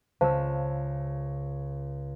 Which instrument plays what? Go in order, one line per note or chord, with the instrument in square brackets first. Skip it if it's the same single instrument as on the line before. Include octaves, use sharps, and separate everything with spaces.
[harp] C#2 E6 [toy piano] C5 F5 A5